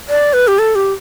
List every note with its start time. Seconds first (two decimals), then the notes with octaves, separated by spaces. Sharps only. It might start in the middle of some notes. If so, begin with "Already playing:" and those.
0.09 D5
0.33 B4
0.48 G4
0.59 A4
0.75 G4